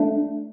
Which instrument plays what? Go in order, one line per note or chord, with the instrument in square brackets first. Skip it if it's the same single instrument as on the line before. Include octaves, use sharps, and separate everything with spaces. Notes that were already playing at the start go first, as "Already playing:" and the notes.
Already playing: [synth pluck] A3 D4